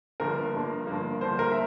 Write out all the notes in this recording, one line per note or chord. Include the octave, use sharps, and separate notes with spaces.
G1 G2 F3 A#3 A#4
G1 G2 F3 A#3
G1 G2 F3 A#3
G1 G2 F3 A#3 C5
A#4
E5